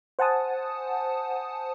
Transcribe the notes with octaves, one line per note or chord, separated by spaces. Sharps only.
C5 F#5 G#5 A5 D#6